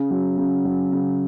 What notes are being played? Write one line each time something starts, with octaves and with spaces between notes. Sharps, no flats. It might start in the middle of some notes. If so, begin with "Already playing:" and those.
Already playing: C#3
F#3
C#3
F#3
C#3